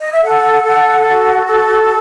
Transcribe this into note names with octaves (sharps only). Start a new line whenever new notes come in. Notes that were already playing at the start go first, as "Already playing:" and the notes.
D#5
E5
A4 F#5
A4
F#4
A4